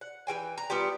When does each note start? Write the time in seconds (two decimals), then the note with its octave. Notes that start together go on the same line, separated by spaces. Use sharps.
0.01 F#5
0.27 E3 F3 G5 G#5
0.58 A#5
0.70 G3 B3 F4 G4